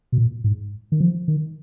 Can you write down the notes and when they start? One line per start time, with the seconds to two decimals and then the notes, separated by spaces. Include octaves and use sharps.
0.12 B2
0.18 A#2
0.44 G#2
0.92 D#3
1.00 F3
1.28 D#3